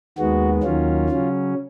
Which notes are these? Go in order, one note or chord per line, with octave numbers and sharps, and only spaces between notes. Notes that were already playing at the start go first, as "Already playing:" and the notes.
D#2 D#3 G#3 B3 F#4
D#2 D#3 F#3 C#4 F4
C#3 F#3 C#4